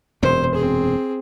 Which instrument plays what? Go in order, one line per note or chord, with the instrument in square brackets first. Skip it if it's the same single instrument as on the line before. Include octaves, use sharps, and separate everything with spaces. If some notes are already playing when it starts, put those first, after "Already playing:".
[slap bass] E1 F#2 C3 [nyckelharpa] C5
[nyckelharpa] C4 G#4